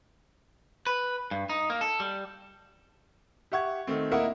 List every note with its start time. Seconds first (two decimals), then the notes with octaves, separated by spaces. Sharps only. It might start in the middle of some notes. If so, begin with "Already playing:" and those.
0.87 B4
1.31 G2
1.50 D#4
1.70 A#3
1.81 A4
2.00 G3
3.52 G4 E5 F#5 C#6 G#6
3.87 D#3 A3 C4
4.11 A#3 E4 A#4 D#5 E5 F#5